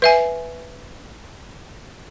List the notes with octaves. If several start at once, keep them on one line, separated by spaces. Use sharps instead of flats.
B4 E5 G#5